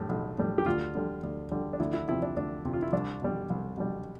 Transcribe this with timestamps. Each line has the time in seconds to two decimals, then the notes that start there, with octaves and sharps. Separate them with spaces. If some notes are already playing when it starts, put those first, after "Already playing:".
Already playing: A2 G3
0.09 B1
0.38 A2 G3
0.58 G4
0.66 D2 F4
0.95 D3 G3
1.23 D2
1.51 D3 G3
1.73 D4
1.80 D2 E4
1.93 E4
2.08 C3 F3 E4
2.22 D4
2.36 D2 D4
2.65 C3 F3
2.73 F4
2.82 E4
2.92 C2 D4
3.22 B2 G3
3.50 C2
3.77 B2 G3